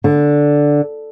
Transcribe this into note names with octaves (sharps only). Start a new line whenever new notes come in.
D3